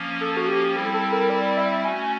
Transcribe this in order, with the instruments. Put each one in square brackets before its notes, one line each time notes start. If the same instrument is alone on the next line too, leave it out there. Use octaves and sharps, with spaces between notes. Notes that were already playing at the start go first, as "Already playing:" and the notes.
Already playing: [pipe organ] F3 A#3 C#4
[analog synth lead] A4
F#4
G4
[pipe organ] G3 C4 E4 [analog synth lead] A4
[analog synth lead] A4
A#4
D5
E5
[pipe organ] A3 C#4 F#4 [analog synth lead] G#5